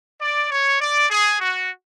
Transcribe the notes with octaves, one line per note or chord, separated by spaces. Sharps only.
D5
C#5
D5
G#4
F#4